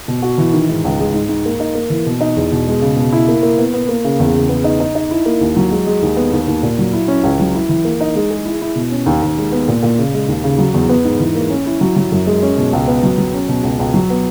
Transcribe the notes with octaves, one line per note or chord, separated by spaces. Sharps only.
B2
F#4
E3
D#3
G#2
C#2
G#3
G#2
G#2
A#3
D#4
A#3
E3
B2
D#4
E2
B2
G#3
C#3
B2
E4
A#3
A#3
B3
B3
A#3
C#3
E2
C#3
B3
D#4
D#4
D#4
E4
A#3
D#2
F#3
G#3
G#3
D#2
B3
D#2
D#2
A#2
F#3
E4
C#4
C#2
F#3
E4
E3
A#3
D#4
G#3
G#4
E4
E4
B2
C#4
D#2
D#2
G#3
B3
A#2
A#2
C#3
G#3
D#2
C#3
F#3
E2
B3
G#2
E3
A#3
C#4
E4
F#3
F#3
F#2
G#3
C#4
B2
C#2
B3
F#3
F#3
C#4
B2
C#2
C#2
F#3
B3